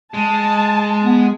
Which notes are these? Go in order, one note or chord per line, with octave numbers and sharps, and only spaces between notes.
G#3 A5
B3